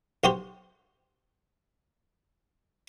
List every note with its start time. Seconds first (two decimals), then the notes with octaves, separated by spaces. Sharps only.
0.24 B1 F#4 G4 C5